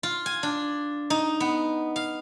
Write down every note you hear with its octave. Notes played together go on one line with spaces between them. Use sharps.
F4
G#5
D4
D#4
B3
F5